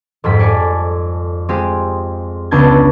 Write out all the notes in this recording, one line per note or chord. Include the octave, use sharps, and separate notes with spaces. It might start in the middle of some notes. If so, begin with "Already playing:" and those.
F2 G#2 G3 B6
A4 D5 G#5
G#3 C4 F4 G4 G#4
C#2 B3 D4 A5 G6 G#6